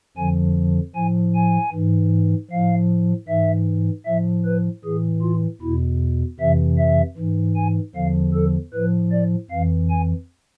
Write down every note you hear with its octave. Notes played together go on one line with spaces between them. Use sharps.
F2 D3 F3 G#5
A2 F3 G#5
G#5
G#2 E3
A2 F3 F5
G#2 E3 E5
A2 F3 E5
B4
A2 E3 G#4
F4
E2 B2 E4
F2 C3 E3 E5
E5
G#2 E3
G#5
E2 D3 F3 F5
A4
A2 F3 B4
D5
F2 E3 F5
G#5